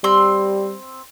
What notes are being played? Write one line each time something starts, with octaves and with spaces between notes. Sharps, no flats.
G3 C4 C6 E6